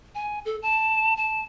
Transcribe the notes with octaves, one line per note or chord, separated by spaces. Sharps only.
G#5
A4
A5
A5